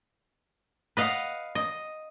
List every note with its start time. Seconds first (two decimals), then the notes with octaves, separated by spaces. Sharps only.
0.97 B4 D#5 F5 F#5
1.55 D#5